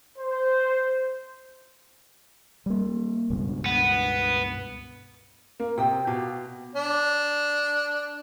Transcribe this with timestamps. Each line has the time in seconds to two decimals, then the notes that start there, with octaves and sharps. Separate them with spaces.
0.18 C5
2.66 G3 A#3
3.30 C#2 G2 B2
3.66 B3
5.60 A#3
5.78 C3 G5 D#6 E6
6.07 B2 G4 F5
6.75 D4